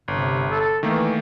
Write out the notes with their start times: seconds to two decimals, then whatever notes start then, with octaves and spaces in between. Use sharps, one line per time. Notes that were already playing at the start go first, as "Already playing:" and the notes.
0.08 G1 C3
0.50 A4
0.83 D#3 E3 A3 A#3